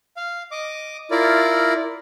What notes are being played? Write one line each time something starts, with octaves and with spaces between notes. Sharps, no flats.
F5
D#5 D6
E4 F4 A#4 D5